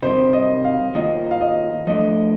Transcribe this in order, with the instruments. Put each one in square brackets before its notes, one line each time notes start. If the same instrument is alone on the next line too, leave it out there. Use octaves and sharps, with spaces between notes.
[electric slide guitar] C3 D#3 G3 C4 [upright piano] C5
[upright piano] D#5
F5
[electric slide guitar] D#3 A#3 F4 [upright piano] D#5
[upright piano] F5
D#5
[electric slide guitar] F3 A3 D4 [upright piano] D#5